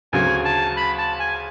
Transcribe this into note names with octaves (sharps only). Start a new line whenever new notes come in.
D2 C#3 F#3 G#5
A5
B5
A5
G#5